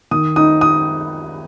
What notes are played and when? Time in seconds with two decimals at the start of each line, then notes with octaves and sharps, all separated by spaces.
0.11 D#3 D#6
0.36 D#4 D#6
0.61 D#6